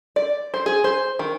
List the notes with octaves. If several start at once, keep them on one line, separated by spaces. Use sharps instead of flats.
D5
C5
G#4
C5
D#3